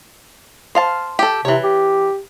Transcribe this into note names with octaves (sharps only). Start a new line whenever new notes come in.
C5 F5 A5
G4 A4
C3 E3 C#5
G4